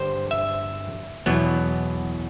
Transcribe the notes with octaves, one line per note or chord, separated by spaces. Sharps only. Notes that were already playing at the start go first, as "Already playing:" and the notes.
Already playing: G2 D3 G3 C5
E5
E2 B2 F#3 B3